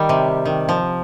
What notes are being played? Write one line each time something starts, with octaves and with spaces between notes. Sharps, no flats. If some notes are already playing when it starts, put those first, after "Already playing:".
Already playing: D#3 G3
C3
D#3
F3